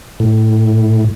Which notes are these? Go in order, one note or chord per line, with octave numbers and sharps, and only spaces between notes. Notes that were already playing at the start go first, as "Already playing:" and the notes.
A2